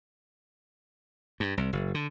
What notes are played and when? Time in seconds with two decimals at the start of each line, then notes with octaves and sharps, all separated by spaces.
1.40 G2
1.57 C2
1.73 F#1
1.94 D3